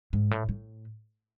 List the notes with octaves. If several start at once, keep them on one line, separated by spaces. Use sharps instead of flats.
G#2
A2
A2